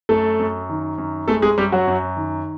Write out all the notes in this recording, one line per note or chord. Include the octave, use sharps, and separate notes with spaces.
F#2 A3 A4
F#2
D#3
F#2
G#3 A3 A4
G#3 G#4
F#2 G3 G4
F#3 F#4
F#2
D#3